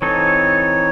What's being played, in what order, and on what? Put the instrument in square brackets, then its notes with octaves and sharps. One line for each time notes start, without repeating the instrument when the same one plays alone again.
[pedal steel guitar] E3 C4 D#4 A4 [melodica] C#5